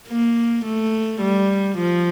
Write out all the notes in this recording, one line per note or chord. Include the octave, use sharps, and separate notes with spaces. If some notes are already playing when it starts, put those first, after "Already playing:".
A#3
A3
G3
F3